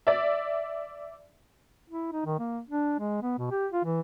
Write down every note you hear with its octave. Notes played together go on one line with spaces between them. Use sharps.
D5 E5
E4
D#4
D#3
A#3
D4
G#3
B3
B2
G4
F4
E3